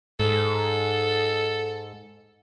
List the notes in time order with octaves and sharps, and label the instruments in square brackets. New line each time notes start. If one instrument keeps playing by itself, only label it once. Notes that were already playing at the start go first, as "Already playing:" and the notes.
[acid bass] G#2 [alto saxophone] A4